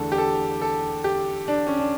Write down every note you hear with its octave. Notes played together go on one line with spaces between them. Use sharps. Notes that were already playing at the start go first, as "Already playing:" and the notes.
Already playing: E2 D3 A3 A4
G4
A4
A4
G4
D4
C#4
D4